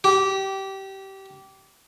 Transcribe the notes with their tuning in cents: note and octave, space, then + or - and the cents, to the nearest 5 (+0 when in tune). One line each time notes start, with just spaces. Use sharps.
G4 -20